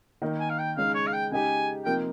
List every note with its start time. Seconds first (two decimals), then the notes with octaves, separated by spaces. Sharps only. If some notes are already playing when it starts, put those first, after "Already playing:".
0.22 D#3 A#3 D#4 A#4
0.40 G#5
0.50 F5
0.59 G5
0.76 C#3 G#3 D#4 F5
0.94 C#5
1.07 F5
1.13 G5
1.31 C#3 G#3 D#4 G4 G#5
1.85 C3 F3 A#3 D#4 A#4 G5